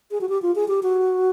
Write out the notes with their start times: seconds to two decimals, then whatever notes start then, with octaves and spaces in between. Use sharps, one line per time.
0.11 G#4
0.21 F#4
0.29 G4
0.42 F4
0.56 G#4
0.68 G4
0.83 F#4